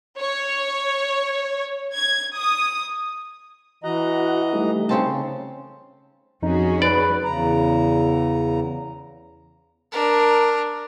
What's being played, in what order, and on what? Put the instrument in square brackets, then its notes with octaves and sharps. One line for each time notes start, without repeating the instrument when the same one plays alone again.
[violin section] C#5
G#6
D#6
[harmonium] E3 D#5 A#5 [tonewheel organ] F#4 F#5
[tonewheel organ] G3 A3 D#4
[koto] C#3 C4 A5
[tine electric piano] F2 D#4 [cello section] C#4 F#4 G#4
[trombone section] B4 [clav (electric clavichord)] D5
[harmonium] E2 C#3 A#5
[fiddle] D4 A#4